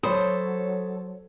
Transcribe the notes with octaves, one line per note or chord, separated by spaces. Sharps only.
F#3 A4 C5 C#5 B5 D#6